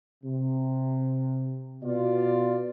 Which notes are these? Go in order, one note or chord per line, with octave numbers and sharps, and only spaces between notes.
C3
B2 F4 D5